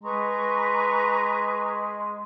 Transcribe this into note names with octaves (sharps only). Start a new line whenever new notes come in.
G#3 B4 A#5 C#6